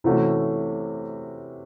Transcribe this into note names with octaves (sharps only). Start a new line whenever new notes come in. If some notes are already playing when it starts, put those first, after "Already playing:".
C3 E3 A3 C#4 F#4